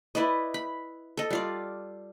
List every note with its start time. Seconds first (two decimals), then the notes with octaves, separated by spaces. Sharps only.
0.15 E4 B4 D5 D#5
0.54 B5
1.17 A4 D#5
1.30 G3 F4 D5